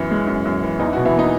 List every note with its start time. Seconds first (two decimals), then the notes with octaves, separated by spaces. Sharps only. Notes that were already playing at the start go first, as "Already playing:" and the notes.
Already playing: F#2 E3 C#4
0.11 G#3
0.27 F#2
0.45 F#2
0.63 E3
0.79 E2 D#4
0.87 E4
0.92 B2 F#3 F#4
1.05 E3 E4
1.14 A#3 D#4